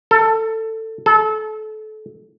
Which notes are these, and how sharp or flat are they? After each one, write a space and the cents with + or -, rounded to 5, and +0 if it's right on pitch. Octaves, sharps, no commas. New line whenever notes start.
A4 +15
A4 -30